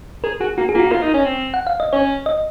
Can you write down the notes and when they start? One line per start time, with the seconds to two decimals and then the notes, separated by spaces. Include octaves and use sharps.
0.24 G#4 A#4
0.40 F#4 G#4
0.58 A#3 F#4
0.69 G#4
0.75 A#3 F4
0.80 F#4
0.91 F4 A#4
1.03 D#4
1.14 C#4
1.25 C4
1.54 F#5
1.67 F5
1.80 D#5
1.93 C#4 C#5
2.26 D#5